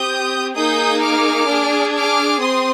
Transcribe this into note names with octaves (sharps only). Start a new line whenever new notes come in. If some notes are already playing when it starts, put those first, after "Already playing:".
Already playing: C4 G4 D#6 G6
A#3 D#4 G#4 D#6 G6
D6 F6
D4 G#4
D6 F6
C4 C6 D#6